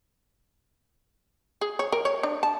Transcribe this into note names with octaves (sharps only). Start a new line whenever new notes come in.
G#4
C#5
A#4
C#5
D4
A5